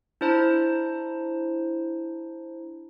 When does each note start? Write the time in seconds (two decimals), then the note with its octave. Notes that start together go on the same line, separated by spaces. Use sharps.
0.21 D4 E4 C5 A5 A#5